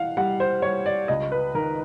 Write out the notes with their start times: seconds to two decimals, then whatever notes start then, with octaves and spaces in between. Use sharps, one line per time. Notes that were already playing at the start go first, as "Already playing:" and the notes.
Already playing: E3 F5 F#5
0.17 G3 F#5
0.40 C5
0.62 G3 C#5
0.86 D5
1.08 C#2 D#5
1.32 B4
1.54 D#3 A#4